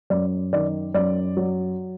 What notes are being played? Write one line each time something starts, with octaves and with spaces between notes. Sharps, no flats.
F#2 D5
D#3 D5
F#2 D5
F#3